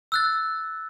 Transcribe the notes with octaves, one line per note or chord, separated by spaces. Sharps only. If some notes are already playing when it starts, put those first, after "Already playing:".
E6 F#6 A6